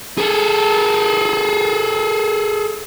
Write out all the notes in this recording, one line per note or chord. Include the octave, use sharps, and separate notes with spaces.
G#4 A4